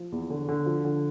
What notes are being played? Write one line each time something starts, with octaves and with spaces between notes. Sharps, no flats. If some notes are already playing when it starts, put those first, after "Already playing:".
Already playing: F3
E2
D3
D3
F3
D3